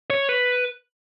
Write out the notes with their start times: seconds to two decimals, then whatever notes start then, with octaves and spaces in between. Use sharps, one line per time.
0.10 C#5
0.29 B4